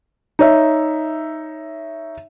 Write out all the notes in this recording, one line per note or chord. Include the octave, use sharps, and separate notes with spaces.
D#4 C#5 E5